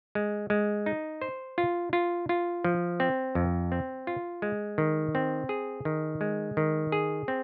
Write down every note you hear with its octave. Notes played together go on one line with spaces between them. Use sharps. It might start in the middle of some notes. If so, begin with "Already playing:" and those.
G#3
G#3
D#4
C5
F4
F4
F4
F3
C4
F2
C4
F4
G#3
D#3
C4
G#4
D#3
G#3
D#3
G#4
C4